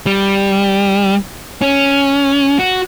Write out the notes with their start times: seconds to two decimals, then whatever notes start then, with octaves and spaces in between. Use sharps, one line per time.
0.06 G3
1.62 C#4
2.59 F#4